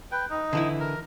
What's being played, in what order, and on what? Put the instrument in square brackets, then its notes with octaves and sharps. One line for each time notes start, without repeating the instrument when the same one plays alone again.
[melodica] B4 G5
D#4
[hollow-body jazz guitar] D3 E3 E4
[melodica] A#4